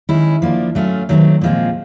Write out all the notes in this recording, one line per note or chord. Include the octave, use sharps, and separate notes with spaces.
D#3 G#3 C#4 E4
F3 A#3 D4
F#3 A3 C#4 F4
D#3 F#3 A3 C4
A#2 F3 G#3 C4